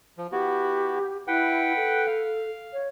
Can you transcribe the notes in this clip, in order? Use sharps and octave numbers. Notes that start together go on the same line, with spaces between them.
F3
B3 E4 F#4 G4
E4 B4 F#5 G5
A4
F5
C#5